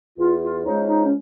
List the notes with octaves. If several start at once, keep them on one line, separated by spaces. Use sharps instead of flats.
E2 F4
F4
C#3 F3 G#3 D#4
D#4
C#4